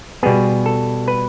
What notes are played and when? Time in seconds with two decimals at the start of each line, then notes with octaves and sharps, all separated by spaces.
0.23 B2 G3 B3 G#4
0.66 A4
1.08 B4